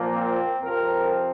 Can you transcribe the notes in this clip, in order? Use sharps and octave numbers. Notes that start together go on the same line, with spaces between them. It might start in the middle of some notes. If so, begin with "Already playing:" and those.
Already playing: A#2 F3 A#3
C4
F2 C3 F3 C4 A#4